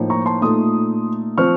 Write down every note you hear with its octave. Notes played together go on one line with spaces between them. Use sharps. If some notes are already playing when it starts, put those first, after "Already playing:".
Already playing: A2 F3 A#3 D#4
A#5 C#6
A5 C6
A#2 A3 D#4 C6 D#6
F3 C4 C#6 F6